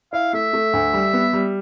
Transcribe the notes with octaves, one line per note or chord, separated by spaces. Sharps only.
E4 F5
A3 E5
A3
D2
G3
B3
G3